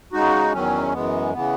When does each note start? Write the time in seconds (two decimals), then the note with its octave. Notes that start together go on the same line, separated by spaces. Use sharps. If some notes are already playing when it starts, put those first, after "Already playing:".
0.13 C#3 G#3 D#4 F#4
0.53 E2 D#3 F#3 C#4
0.93 F#2 E3 G#3 B3
1.33 C#3 E3 B3